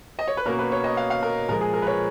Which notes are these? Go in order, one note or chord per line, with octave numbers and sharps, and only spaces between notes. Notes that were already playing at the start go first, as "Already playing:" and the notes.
D#5
C#5
B4
B2 A#3 C#4 A#4
B4
C#5
D#5
F5
F5
A#4
A#2 F3 G#3 A#4
G#4
A#4
B4
C#5